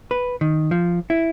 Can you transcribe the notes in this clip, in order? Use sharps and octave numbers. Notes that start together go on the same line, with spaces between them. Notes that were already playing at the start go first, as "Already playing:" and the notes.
B4
D#3
F3
E4